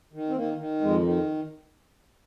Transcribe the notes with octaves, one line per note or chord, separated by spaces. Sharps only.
D#3
C4
D#3 A#3
D#3
F2 G#3
D#3